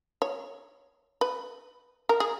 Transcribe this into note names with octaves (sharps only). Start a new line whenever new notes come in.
C#5
B4
A#4
G#4